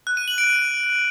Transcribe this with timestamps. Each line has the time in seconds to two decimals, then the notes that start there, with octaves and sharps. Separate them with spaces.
0.07 F#6
0.17 D#7
0.28 F#7
0.38 D7